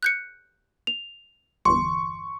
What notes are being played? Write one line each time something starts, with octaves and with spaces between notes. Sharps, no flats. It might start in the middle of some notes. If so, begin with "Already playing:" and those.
F#6 G6 C#7
F7
G1 E2 C6 C#6